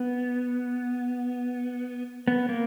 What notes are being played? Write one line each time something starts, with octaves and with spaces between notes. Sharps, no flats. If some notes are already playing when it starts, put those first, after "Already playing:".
Already playing: B3
B3
A#3